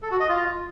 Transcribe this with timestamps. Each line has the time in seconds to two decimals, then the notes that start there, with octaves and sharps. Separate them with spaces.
0.02 A4
0.11 F#4
0.20 D#5
0.29 F4